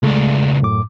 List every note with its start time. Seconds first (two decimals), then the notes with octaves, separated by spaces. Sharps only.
0.03 C#2 G#3 A3 D4
0.62 F#2 A2 D6